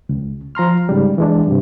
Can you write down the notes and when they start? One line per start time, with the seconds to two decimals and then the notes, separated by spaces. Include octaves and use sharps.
0.09 C#2
0.55 F3 A#5 C6 F6
0.89 G#2 C#3 G3
1.18 E3 G#3 D4
1.47 G2 C3